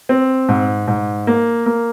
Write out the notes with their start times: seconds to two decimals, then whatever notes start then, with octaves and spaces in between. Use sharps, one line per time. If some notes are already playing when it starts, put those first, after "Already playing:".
0.09 C4
0.49 G#2
0.88 G#2
1.27 A#3
1.66 A#3